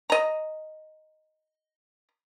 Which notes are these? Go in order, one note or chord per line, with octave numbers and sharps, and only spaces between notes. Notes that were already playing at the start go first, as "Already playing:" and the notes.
D#5 A#5